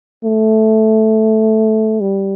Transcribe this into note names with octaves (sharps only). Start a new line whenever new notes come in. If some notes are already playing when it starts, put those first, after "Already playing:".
A3
G3